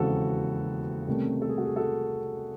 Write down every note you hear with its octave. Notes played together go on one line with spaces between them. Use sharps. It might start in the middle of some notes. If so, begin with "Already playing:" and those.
Already playing: E1 D#2 C#3 E3 C4 F#4 A4
C2 C3 D#3 A3 C#4
A4
G#4
F#4
G#4
F#4 A4